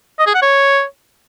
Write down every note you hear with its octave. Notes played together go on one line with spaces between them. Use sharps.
D#5
G#4
F#5
C#5